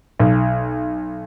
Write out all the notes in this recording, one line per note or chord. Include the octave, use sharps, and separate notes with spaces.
B1